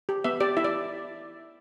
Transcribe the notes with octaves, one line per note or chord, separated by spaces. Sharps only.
G4
B3 E5
G4 D5
E4 E5
D5